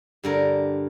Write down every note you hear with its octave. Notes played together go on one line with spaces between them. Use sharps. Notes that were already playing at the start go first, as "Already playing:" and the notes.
G2 D3 A#4